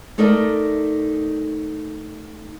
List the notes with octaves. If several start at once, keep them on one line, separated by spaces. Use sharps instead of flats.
A3 D#4 A4 A#4 D5 D#5